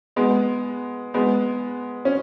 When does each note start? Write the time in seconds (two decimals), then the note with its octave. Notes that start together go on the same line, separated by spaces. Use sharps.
0.16 G#3 B3
1.14 G#3 B3
2.05 C#4